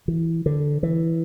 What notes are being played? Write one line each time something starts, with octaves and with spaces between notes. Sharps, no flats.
E3
D3
E3